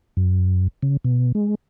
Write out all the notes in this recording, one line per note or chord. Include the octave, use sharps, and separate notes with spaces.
F#2
C#3
B2
G#3